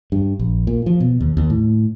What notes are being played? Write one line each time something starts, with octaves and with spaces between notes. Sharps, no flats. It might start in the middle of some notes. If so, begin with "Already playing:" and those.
G2
A#1
A#2
F3
B2
D#2
D#2
A2